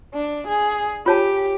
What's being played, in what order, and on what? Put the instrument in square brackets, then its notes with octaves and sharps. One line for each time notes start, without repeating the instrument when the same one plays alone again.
[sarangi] D4
G#4
[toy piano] F4 C#5 A5 [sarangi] G4